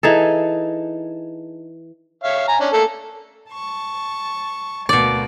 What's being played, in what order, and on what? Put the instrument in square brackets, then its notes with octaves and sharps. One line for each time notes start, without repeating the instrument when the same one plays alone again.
[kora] E3 D#4 G#4 A4
[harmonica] C#5 E5 F5
G#5 A#5
C#4 D4
A3 A#3 A4
[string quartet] A5 C#6
[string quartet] D2 A#3 [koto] B2 D5